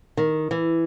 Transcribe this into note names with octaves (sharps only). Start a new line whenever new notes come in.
D#3
E3